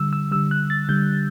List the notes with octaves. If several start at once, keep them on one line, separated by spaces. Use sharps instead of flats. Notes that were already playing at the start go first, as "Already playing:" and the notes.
Already playing: D3 G3 E6
E6
D3 G3 E6
F#6
A6
D3 G3 G6